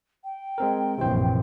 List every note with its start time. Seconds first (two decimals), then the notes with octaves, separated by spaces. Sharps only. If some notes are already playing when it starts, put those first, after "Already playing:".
0.24 G5
0.58 G#3 C4 A#4
0.98 A#1 F#2 C3 E3 C5